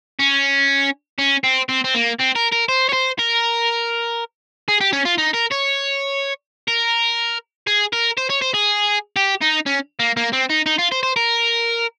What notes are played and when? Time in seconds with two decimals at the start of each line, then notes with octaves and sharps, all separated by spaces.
0.20 C#4
1.19 C#4
1.44 C4
1.69 C4
1.84 C4
1.94 A#3
2.19 C4
2.35 A#4
2.52 A#4
2.69 C5
2.89 C#5
2.93 C5
3.19 A#4
4.68 G#4
4.81 G4
4.93 C#4
5.05 F4
5.18 D#4
5.34 A#4
5.52 C#5
6.68 A#4
7.67 G#4
7.93 A#4
8.17 C5
8.30 C#5
8.42 C5
8.54 G#4
9.16 G4
9.42 D#4
9.66 C#4
10.00 A#3
10.17 A#3
10.33 C4
10.49 D#4
10.66 D#4
10.78 F4
10.92 C5
11.03 C5
11.16 A#4